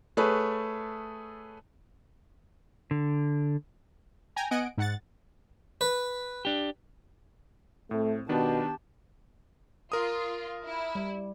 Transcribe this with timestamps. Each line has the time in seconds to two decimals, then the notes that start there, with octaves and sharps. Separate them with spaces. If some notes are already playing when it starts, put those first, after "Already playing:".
0.17 A3 G#4 A4 B4 C#5
2.91 D3
4.36 G5 G#5 A#5
4.51 B3 D#5 F#5 G#5 D7
4.78 G#2 F#5 A6
5.81 B4
6.45 D4 G4
7.91 A2 A3 C4
8.29 B2 D#3 B3 D4 G4 A5
9.92 F4 A#4 D#6
10.65 E4
10.95 G3